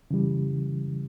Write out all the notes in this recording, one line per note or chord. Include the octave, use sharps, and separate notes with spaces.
C#3 E3 G3